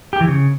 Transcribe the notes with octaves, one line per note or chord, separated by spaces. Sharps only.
G4
E3
C#3